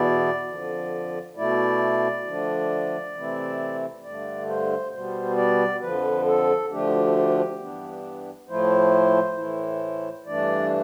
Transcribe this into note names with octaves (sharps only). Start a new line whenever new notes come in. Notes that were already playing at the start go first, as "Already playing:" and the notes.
Already playing: E2 B2 B3 E4 D5
F2 D3 F3
B2 A3 E4 D5
D3 F3 A3 D4
C3 E3 A3 C4 E4
G2 D3 A3 D5
C5
B2 G3 B3 C5
D5
F2 D3 F3 B4
A4
D2 D3 F3 A3 D4 G4
G2 E3 B3 D4
A2 F3 A3 E4 C5
A2 E3 A3 E4
G2 E3 A3 D4 D5